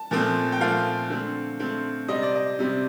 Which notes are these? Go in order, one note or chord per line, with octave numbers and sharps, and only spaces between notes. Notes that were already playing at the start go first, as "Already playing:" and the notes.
Already playing: A5
A#2 F3 A3 C4
G5
A#2 F3 A3 C4 F5
D3 A3 C4
D3 A3 C4
C3 G3 C4 D#5
D5
D#5
C3 G3 C4